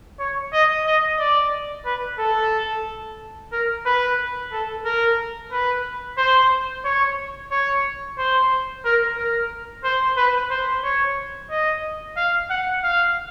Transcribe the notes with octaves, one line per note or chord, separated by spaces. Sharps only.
C#5
D#5
D#5
D5
B4
A4
A#4
B4
A4
A#4
B4
C5
C#5
C#5
C5
A#4
A#4
C5
B4
C5
C#5
D#5
F5
F#5
F5